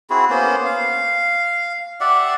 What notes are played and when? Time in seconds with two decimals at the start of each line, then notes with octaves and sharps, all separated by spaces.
0.10 C4 E4 F#4 G#4
0.30 A#3 B3 C#4 C5
0.66 F5
2.01 G4 D5 E5 F#5